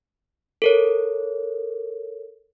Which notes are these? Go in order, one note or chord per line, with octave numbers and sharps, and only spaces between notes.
A4 A#4 C#5